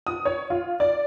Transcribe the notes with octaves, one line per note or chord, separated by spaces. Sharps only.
D#6
C#5
F4
D5